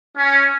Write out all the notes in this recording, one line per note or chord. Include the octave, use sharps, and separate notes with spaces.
C#4